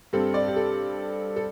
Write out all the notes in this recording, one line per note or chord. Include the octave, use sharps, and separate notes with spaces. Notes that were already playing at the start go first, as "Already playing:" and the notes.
G2 G3 C4 A4
D5
G4
A4
A4